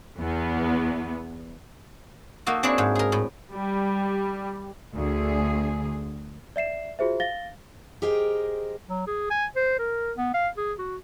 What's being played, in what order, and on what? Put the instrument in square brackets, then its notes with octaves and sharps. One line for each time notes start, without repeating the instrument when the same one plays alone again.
[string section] E2 B3
[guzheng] A#3 D#4 F#4 A4
C4 D4 E4 G#4 C#5
G#2
G#4 A#4
A2
[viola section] G3
[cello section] D2 D3 G#4
[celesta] D5 E5 C7 E7
F4 F#4 G#4 C5 E5
F5 A6 A#6 G7
[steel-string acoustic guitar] G4 G#4 A#4 C5 D#5 G5
[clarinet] F#3
G#4
G#5
C5
A#4
B3
F5
G#4
F#4